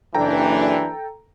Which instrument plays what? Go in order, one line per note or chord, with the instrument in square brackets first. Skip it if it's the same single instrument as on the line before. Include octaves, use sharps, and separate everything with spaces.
[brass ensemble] F#1 E3 D4 [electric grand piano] A4 G5 A#5